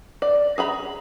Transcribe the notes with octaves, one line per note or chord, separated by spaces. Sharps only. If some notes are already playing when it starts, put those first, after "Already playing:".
D5
G#4 A#5 B5